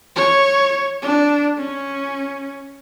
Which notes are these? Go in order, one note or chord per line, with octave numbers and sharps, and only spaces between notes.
C#5
D4
C#4